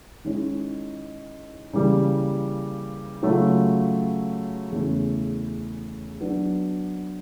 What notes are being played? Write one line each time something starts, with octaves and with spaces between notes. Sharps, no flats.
D#3 G#3 C#4 E4
C#3 E3 G3 A#3
C#3 F#3 A3 C#4 F4
E2 C#3 E3 A3 C#4
F#3 B3 D4